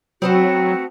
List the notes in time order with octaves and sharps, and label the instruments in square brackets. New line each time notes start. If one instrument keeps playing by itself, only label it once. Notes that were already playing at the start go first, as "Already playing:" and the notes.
[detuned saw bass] F#3 [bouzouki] A3 B3 C4 [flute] F#4